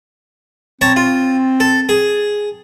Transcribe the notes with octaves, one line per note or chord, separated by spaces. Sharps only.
C4 C#5 A5 A#5
F4
A4
G#4